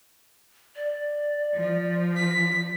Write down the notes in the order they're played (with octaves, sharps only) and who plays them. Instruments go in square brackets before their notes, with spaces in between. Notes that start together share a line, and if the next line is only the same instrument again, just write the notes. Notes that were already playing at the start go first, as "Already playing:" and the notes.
[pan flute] D5
[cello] F3
[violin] B6